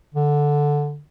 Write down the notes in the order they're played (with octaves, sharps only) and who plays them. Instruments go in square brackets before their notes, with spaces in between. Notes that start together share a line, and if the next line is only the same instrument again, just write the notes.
[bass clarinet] D3